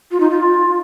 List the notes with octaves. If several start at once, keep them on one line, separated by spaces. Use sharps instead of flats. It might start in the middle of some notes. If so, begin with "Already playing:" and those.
F4
D#4
F4